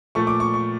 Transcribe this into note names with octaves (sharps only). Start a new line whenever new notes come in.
A#2 F3 A3 C#6
D6
C#6
C#6